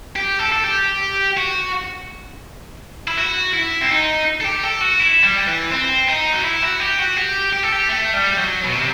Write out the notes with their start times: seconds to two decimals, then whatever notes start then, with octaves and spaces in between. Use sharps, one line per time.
0.16 G4
0.39 A4
0.52 A4
0.64 G4
1.37 F#4
3.08 E4
3.17 F#4
3.54 E4
3.81 C4
3.90 D#4
4.41 A4
4.45 G4
4.63 A4
4.81 F#4
5.00 E4
5.23 G3
5.47 E3
5.72 C4
6.08 D#4
6.33 F#4
6.44 E4
6.63 F#4
6.80 G4
6.99 F#4
7.17 G4
7.53 G4
7.63 A4
7.72 G4
7.89 A3
8.13 G3
8.38 F#3
8.64 B2
8.75 C3